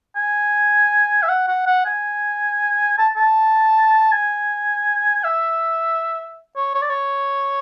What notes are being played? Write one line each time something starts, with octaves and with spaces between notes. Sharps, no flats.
G#5
E5
F#5
F#5
F#5
G#5
A5
A5
G#5
E5
C#5
C#5
D5
C#5